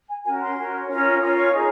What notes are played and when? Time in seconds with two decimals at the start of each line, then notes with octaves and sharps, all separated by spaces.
0.09 G#5
0.24 C#4 F#4 A#4 G#5
0.40 C6
0.57 C#4 F#4 A#4
0.87 C#4 F4 A#4 C#5
1.19 C#4 F4 A#4 C#5 D#6
1.35 C#6
1.52 D#4 G#4 C#5